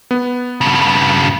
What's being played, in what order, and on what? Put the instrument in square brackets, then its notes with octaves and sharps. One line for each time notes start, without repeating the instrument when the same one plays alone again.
[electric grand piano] B3
[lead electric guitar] G2 C#3